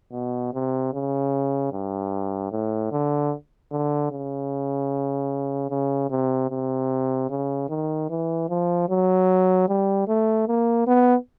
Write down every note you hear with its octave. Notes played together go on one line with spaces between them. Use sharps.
B2
C3
C#3
G2
A2
D3
D3
C#3
C#3
C3
C3
C#3
D#3
E3
F3
F#3
G3
A3
A#3
B3